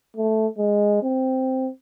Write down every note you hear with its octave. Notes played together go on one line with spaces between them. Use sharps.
A3
G#3
C4